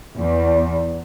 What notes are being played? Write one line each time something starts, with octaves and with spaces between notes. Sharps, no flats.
E2